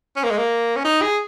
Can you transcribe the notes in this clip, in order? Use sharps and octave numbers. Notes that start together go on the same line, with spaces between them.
C#4
A#3
G#3
A#3
C#4
D#4
G#4